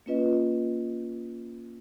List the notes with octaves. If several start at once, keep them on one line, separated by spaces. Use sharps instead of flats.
A#3 C#4 F4 B4 D#5